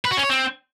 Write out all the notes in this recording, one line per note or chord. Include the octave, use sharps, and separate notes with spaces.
B4
F#4
C#4
C#5
C4